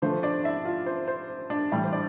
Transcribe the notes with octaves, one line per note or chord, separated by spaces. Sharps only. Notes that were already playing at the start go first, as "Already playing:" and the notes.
D3 F3 A3 C5
D4 D5
E4 E5
F4 F5
C5
C5
D4 D5
A2 E3 G3 E4 E5
C5
D4 D5